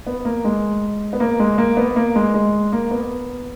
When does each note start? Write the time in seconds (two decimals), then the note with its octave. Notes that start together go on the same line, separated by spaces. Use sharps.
0.07 B3
0.25 A#3
0.45 G#3
1.13 B3
1.20 A#3
1.40 G#3
1.58 A#3
1.77 B3
1.96 A#3
2.16 G#3
2.34 G#3
2.72 A#3
2.91 B3